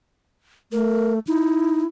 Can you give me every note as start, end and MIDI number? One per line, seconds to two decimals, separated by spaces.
0.72 1.19 57
0.72 1.13 70
1.27 1.83 63
1.27 1.87 64